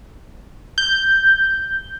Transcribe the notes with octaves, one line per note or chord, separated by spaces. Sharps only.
G6